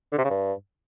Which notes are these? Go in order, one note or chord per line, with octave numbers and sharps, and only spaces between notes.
D3
C3
C#3
G2